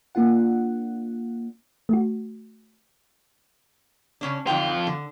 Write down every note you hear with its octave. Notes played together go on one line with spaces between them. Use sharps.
A#3 D4 F4 F#5
A3 F#4
C#3 C#4 D4
F2 D3 D#4 F4 G5
D3